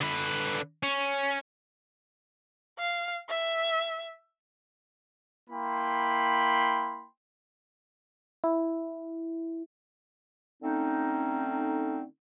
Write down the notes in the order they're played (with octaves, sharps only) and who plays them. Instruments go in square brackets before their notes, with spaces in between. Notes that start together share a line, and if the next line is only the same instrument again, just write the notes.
[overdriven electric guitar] D3 B4
C#4
[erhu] F5
E5
[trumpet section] A#3 E4 G5 B5 C6
[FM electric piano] E4
[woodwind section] D3 A3 C4 C#4 D#4